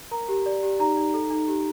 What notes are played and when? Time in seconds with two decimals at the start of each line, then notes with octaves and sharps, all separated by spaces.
0.11 A#4 A#5
0.29 G4
0.46 D5
0.63 G4
0.79 D#4 A#5
0.97 D#4
1.14 A4
1.30 D#4
1.48 G4